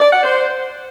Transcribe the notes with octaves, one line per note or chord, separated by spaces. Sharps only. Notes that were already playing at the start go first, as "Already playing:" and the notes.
D5
F#5
C5